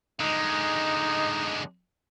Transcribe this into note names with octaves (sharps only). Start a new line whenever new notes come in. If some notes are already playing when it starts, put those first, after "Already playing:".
D3 G#3 D#4